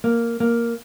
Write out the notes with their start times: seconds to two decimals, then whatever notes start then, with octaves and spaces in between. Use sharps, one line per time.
0.04 A#3
0.40 A#3